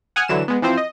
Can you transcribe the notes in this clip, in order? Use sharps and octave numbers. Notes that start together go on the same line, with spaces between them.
F#5 G#5 D#6 F6 G#6
D3 E3 F#3 E7
G#3 B3
E3 F3 C4 C5
D#5